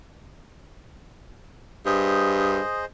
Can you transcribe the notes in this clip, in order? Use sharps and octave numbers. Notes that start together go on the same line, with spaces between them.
G2 G#4 C5 D#5